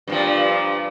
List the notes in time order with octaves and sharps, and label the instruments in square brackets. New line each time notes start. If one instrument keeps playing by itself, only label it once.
[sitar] G2 A#2 F3